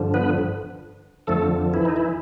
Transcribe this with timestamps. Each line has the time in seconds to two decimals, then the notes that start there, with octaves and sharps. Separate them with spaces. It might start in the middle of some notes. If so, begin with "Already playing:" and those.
Already playing: G2 D3 F3
0.14 B3 B4
1.27 F2 D3 F3 A3 A4
1.73 E3 E4
1.85 D#4
1.96 E3 E4